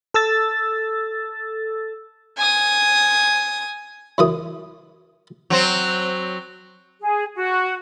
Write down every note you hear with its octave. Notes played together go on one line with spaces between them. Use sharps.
A4 E6 A6
G#5 D#6
F#2 E3 D#6
F#3 C4
G#4
F#4